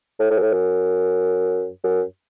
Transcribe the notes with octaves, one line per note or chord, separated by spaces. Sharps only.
A2
A2
F#2
A2
F#2
F#2